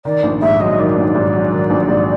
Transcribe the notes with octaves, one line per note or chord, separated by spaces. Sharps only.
D#3 D5
A#1
G#2 E5
F#3 D#5
D#3 D5
A#1
G#2
F#3
D#3
A#1
G#2